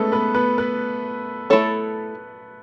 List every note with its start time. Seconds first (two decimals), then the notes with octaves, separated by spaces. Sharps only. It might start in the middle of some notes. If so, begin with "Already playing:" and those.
Already playing: G#3 A3 B3 C#4 A4 B4
0.12 B3 B4
0.35 B3 B4
0.58 B3 B4
1.50 A3 E4 A4 C#5